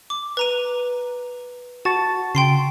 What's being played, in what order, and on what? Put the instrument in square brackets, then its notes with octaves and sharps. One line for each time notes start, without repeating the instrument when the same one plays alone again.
[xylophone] D6
B4 A#5 D#7
[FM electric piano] F#4 C#6 A6 [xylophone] A5
[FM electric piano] C#3 [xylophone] G5 C6 C7